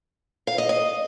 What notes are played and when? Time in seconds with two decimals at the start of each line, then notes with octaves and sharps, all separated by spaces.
0.47 F5
0.58 D#5
0.69 D#5